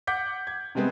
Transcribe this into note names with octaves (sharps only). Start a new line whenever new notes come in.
F#5 D6 G6 B6
G#6
C3 G3 G#3 B3 C4